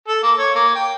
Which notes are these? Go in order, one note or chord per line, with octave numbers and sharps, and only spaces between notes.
A4
A#3
C#5
A#3
G5